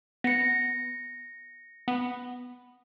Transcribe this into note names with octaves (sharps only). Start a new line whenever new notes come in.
B3 A#6 C#7
B3